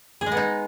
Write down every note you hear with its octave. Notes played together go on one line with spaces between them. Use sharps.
G#4
G#3
B3
D#4